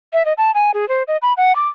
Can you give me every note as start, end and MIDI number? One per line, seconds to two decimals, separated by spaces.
0.13 0.25 76
0.25 0.33 75
0.38 0.51 81
0.54 0.71 80
0.74 0.88 68
0.89 1.03 72
1.08 1.17 75
1.22 1.33 83
1.37 1.55 78
1.56 1.68 86